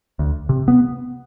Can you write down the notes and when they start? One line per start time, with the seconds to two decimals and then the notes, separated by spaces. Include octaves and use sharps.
0.19 D2
0.49 C3
0.68 B3